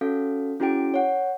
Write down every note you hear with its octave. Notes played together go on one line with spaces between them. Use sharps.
C#4 F#4 A4 F5
C#4 E4 F#4 G#4 G5 D7
C#5 F#5